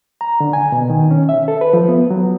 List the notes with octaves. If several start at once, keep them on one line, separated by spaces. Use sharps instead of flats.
A#5
D3
G#5
B2
D#3
C#4
E5
A4
B4
F3
B3
F#3